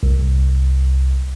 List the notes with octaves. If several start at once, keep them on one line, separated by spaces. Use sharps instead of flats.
C2